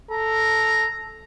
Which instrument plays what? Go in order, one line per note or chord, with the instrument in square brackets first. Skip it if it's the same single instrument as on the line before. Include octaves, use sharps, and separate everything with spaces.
[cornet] A4 [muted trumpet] A#5